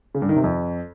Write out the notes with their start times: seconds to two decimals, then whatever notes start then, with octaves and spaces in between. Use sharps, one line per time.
0.15 C#3
0.22 G2
0.29 D#3
0.36 C3
0.44 F2